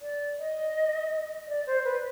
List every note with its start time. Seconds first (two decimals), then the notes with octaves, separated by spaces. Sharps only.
0.02 D5
0.39 D#5
1.48 D5
1.67 C5
1.84 B4